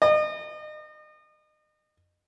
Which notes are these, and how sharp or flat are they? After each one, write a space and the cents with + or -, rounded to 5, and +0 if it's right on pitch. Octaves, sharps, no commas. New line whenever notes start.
D#5 -35